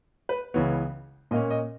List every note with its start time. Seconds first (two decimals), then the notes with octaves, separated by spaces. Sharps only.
0.29 B4
0.54 C#2 C#3 E3 B3 C#5
1.31 A#2 A#3 C#4 D#5
1.50 D#5